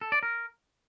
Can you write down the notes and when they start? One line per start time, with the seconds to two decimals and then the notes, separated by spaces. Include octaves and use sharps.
0.01 A4
0.12 D5
0.23 A#4